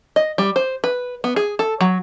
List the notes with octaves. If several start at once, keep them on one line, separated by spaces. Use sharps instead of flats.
D#5
G3
C5
B4
B3
G#4
A4
F#3